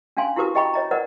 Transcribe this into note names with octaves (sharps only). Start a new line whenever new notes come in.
C#4 D4 F5 G#5 C6
E4 F#4 G4 A#4 B4 D#6
G4 D#5 G5 A#5 B5 C#6
C#5 D#5 A#5
A#4 B4 D5 D#5 F#5